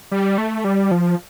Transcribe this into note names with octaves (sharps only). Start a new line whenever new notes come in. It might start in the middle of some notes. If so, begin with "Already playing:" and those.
G3
A3
G3
F3